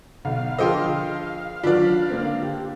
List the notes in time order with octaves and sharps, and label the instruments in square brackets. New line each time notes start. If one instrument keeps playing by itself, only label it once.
[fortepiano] B1 [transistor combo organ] F5
[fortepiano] D3 F3 C5 [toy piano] G#4 A#4 [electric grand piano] D#5 G5 C6
[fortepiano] D#3 F#3 [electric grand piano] D4 D5 [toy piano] F4 B4
[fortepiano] D3 A#3 C4
[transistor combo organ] G4